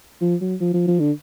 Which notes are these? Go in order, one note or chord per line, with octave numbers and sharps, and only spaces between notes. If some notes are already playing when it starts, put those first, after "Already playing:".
F3
F#3
F3
F3
F3
D3